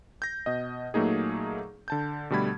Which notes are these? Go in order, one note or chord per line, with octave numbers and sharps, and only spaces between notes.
G6 A#6
B2 D#5
A#2 F#3 A3 A#3 D#4 G#4
D3 A5 G6
B2 D3 G3 A3 B5 G#6